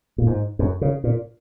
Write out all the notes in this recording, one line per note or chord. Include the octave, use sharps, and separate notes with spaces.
A#2
G#2
F#2
C#3
A#2